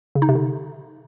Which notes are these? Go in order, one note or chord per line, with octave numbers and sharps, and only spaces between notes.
C#3
D#4
C3
D3